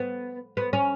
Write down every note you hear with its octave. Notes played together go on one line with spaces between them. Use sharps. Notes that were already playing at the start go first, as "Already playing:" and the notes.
Already playing: B3
B3
C#4